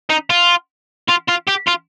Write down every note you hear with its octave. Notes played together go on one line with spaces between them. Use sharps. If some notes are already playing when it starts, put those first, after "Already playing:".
D#4
F4
F4
F4
G4
F4